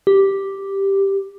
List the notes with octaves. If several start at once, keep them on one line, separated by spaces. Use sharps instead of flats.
G4